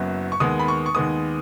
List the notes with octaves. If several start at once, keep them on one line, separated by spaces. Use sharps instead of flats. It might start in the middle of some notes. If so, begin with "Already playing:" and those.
Already playing: F#1 F#2 F#3 B3
C#6
D#2 D#3 G#3 B3 D#6
B5
C#6
C#6
D#2 D#3 G#3 B3 D#6